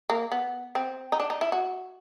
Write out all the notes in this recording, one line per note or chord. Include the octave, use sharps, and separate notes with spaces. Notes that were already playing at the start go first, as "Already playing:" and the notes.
A#3
B3
C4
D#4
D4
D#4
E4
F#4